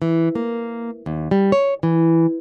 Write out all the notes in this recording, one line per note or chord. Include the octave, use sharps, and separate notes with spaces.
E3
A#3
D#2
G3
C#5
E3